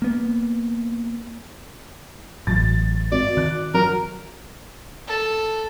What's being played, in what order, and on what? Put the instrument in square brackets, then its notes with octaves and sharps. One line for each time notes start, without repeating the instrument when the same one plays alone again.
[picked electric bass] A#3 B3
[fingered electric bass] A1 F#3 [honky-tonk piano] A6
[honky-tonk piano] G#1 [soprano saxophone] D5
[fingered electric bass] D#3 [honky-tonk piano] F#6
[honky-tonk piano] F#3 [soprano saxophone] A#4
[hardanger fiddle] A4